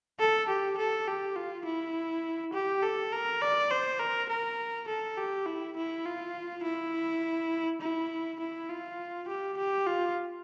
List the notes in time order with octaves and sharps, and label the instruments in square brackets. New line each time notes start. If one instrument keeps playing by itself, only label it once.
[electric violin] A4
G4
A4
G4
F4
E4
G4
A4
A#4
D5
C5
A#4
A#4
A4
G4
E4
E4
F4
E4
E4
E4
F4
G4
G4
F4